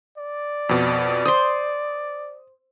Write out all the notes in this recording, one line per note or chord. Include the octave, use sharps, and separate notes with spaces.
D5
F2 B2
C5 C6 D#6